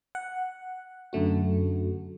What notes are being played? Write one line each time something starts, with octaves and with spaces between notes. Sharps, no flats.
F#5
F#2 D3 A3 F#4